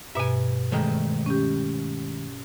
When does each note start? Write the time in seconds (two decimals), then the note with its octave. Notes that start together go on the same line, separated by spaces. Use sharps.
0.15 G2 B2 E5 G#5
0.72 D#3 G#3 A3
1.26 C#4 G4